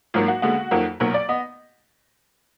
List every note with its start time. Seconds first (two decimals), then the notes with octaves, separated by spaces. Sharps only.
0.14 G#1 G#2 F#3 A#3 F4
0.28 F#4
0.42 D#2 D3 G#3 B3 F#4
0.71 F2 D#3 F#3 A#3
1.00 B1 A#2 F#3 A#4
1.14 D5
1.29 B3 D#5